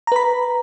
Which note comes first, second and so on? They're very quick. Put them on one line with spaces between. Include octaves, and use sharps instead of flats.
A#5 B4 B5